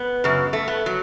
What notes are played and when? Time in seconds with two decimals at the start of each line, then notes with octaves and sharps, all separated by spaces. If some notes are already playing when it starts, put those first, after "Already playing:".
Already playing: B3
0.24 F#2 C#3
0.53 A3
0.68 B3
0.86 F#3